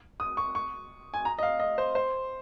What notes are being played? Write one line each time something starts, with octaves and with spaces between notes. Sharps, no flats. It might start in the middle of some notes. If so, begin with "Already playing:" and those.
D#6
C#6
C#6
G#5
A#5
D#5
F5
D#5
C5
C5